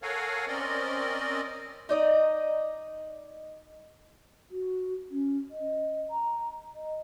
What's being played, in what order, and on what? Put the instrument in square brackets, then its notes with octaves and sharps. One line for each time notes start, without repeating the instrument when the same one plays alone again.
[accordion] A4 A#4 C#5 F5 F#5 G#5
C4 C#4 A#4 D5 D#5
[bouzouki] D#4 D5 D#5
[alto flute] F#4
C#4
D#5
A#5
D#5